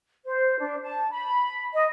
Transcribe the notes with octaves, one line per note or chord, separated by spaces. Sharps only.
C5
D4
A5
B5
D#5